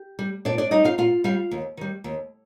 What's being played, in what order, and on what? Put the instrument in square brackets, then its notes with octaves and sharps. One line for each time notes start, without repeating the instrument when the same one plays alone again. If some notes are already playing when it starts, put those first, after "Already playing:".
Already playing: [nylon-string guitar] G4
G3
A#2 D4 D5
D4 D5
G3 D#4 D#5
F4 F5
A#2 F4 F5
G3 F4 F5
D#2
D#3 G3
D#2